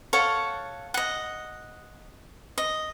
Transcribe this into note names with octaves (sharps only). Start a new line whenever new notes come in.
A4 C#5 F5 F#5
D#5 F#5
D#5